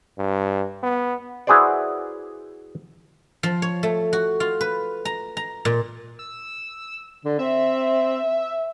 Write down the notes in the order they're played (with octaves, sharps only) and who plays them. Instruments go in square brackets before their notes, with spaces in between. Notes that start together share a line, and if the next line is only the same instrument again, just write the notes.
[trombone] G2
B3
[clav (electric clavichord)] E4 F#4 G#4 B4 C5 D5
[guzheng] F3
C#5
A3
F#4
F4
B4
A#5
A#5
A#2
[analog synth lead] E6
[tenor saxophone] D3
[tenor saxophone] C4 [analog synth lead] E5